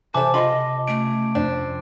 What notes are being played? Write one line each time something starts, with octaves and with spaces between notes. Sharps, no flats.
C3 E3 A4 C5 A5 D6
F4 D#5 B5
A3 C#4 D7
F2 C4 D4